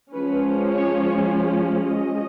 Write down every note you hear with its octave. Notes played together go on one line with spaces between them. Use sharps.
F3 G#3 C#4 B4
C#5
D#5